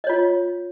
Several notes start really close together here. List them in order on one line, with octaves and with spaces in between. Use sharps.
D#5 C#5 F4